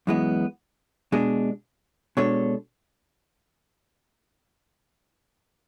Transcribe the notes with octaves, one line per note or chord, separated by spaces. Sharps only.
F#2 E3 G#3 B3
B2 G#3 D4 G#4
B2 G#3 D4 A4 C#5